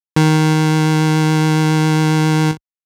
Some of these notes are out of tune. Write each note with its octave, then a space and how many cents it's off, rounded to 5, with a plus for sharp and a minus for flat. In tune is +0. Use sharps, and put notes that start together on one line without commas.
D#3 +5